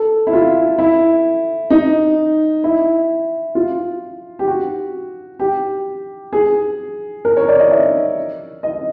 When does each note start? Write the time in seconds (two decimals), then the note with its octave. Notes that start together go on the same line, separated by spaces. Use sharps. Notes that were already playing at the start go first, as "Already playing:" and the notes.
Already playing: A4
0.27 E4
0.33 F4
0.78 E4
1.70 D#4
2.64 E4
3.55 F4
4.39 G4
4.48 F#4
5.40 G4
6.33 G#4
7.25 A#4
7.37 C#5
7.48 D5
7.59 D#5
7.71 E5
8.63 D#5